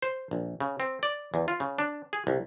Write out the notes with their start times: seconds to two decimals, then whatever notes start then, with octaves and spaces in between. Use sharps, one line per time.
0.02 C5
0.31 A#1
0.60 C#3
0.80 C4
1.03 D5
1.34 E2
1.48 F4
1.60 C#3
1.79 D4
2.13 G#4
2.27 C2